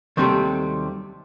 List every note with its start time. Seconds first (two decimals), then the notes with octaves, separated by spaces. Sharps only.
0.17 D#2 C3 F#3 G3 A3 C4